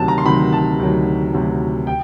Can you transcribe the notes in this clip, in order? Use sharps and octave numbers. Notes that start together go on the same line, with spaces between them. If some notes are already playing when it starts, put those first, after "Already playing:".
Already playing: D2 C3 D#3 F#3 A5
A#5
C6
D2 C3 D#3 F#3 B5
A5
D2 C3 D#3 F#3
D2 C3 D#3 F#3
G5